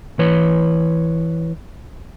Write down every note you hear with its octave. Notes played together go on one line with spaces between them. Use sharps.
E3 B4 C#5